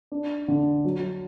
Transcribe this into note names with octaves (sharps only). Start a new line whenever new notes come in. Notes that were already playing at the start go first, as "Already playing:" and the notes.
D4
D3
F#3